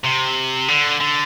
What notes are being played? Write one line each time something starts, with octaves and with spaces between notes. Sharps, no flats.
C3
D3
D3